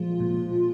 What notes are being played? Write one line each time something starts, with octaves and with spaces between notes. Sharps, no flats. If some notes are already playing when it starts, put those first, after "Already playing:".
Already playing: A#2 F3 G#3 F4
A#2